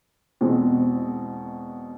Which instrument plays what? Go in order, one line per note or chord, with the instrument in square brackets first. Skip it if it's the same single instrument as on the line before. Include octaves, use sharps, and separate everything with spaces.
[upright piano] E2 B2 G#3 C4